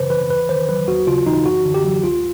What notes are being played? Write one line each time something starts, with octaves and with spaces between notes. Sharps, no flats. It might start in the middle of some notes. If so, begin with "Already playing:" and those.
Already playing: F#2 C#3 E3 B4 C5
E3 B4
D#2 B4
D#3 C5
F#3 B4
D#2 F#4
C#3 F4
E3 D#4
F#2 F#4
D3
G4
F#3
C#2 F4